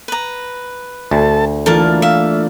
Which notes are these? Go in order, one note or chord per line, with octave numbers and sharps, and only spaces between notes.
B4 A#5
D2 A4 A5
E3 A3 A#3 D4 F4 A4 A#4 A5
E5 F5